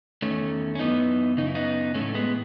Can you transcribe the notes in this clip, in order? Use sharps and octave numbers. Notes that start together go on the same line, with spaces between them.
E2 D#3 A3 C#4
C#4
F#2 E3 B3 D#4
F#2 C#3 D#4
E4
B3 D#4
A2 E3 A3 C#4
G#3 B3